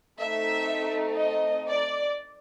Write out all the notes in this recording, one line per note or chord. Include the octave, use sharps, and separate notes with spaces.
A3 C4 D#4 E5
D#5
D5